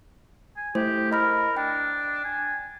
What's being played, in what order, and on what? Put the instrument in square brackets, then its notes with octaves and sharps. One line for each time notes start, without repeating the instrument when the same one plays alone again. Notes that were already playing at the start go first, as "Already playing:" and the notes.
[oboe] G#5
[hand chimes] A3 E4 C5 [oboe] G4
[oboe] A#4 [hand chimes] D#5 B5 F6
[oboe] D4 [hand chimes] G5
[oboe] G#5